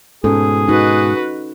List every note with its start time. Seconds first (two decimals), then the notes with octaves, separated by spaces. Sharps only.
0.24 G#2 B2 C#4 G#4 A4
0.69 D#4 F#4 B4